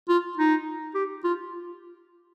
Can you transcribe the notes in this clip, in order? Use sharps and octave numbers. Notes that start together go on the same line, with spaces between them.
F4
D#4
G4
F4